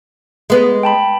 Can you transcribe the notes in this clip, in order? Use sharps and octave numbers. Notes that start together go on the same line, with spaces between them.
G#3 B3
G5 A5 B5